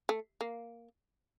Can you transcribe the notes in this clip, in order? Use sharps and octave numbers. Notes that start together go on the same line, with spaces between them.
A3
A#3